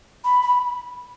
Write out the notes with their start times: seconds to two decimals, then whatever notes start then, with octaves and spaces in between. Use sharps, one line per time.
0.25 B5
0.42 B5